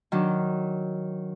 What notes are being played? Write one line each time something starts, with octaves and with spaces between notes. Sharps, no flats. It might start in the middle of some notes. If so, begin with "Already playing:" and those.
D#3 F#3 D4